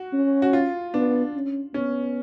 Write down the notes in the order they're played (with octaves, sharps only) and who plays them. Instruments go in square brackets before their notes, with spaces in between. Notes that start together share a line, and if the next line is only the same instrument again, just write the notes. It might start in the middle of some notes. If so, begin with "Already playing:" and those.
Already playing: [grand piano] F#4
[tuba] C#4
[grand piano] F#4
F4
[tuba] B3 [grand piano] D4
[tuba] C#4
[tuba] B3 [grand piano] C#4